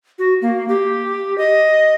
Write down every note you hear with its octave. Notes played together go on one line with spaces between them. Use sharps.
F#4
A#3
G4
D#5